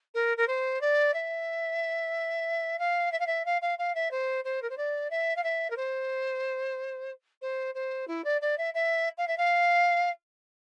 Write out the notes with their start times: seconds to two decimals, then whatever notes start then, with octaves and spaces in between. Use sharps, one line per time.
0.14 A#4
0.37 A#4
0.47 C5
0.81 D5
1.14 E5
2.79 F5
3.11 E5
3.19 F5
3.26 E5
3.45 F5
3.61 F5
3.78 F5
3.95 E5
4.11 C5
4.44 C5
4.62 A#4
4.69 C5
4.77 D5
5.10 E5
5.36 F5
5.43 E5
5.70 A#4
5.76 C5
7.41 C5
7.74 C5
8.07 E4
8.24 D5
8.41 D5
8.57 E5
8.74 E5
9.17 F5
9.27 E5
9.37 F5